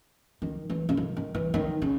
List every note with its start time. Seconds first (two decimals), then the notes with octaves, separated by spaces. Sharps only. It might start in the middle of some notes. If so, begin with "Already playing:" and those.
0.42 D#3
0.70 E3
0.89 C#3
0.97 D#3
1.17 D#3
1.35 E3
1.54 D#3
1.82 C#3